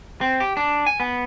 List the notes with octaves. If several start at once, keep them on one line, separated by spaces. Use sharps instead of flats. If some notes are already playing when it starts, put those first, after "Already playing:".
C4
G4
D4
G#5
B3